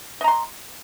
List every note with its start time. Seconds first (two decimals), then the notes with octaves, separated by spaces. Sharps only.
0.21 D#5
0.24 A#5
0.28 C6